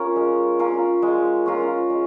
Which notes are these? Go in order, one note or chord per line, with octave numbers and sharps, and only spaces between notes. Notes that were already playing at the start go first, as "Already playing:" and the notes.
Already playing: C#4 F4 A#4
G#3
C#4 F4 A#4
G#3
C#4 F4 A#4
G#3